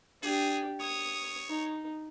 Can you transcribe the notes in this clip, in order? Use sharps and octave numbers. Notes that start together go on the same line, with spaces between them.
D4 G4 G#4
C#5 D#6
D#4